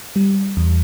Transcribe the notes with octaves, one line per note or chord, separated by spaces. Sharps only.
G3
E2